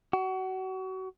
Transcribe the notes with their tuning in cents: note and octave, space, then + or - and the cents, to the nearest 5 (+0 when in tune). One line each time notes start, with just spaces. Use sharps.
F#4 +30